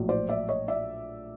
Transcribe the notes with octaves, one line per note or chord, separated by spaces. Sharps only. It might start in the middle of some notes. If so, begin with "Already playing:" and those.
Already playing: A#1 A2 F#3
C5 D5
D5 E5
C#5 D#5
D5 E5